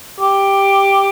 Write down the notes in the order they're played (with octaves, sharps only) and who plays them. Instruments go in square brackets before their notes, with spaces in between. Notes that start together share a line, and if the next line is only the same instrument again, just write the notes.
[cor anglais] G4